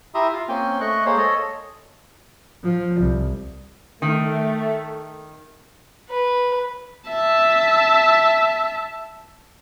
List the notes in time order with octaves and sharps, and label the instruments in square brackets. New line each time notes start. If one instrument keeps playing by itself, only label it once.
[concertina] E4 G4 E5 A#5 C6 D#6
F4 F5
A#3 C4 C#4 G5 G#5
A3 D#5 C#6 F#6
G#3 A#3 C5 C#5
A4 C#5 D#5
[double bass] F3
C2
[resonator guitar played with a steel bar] D#3 [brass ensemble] A3
[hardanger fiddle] B4
[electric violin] E5 A5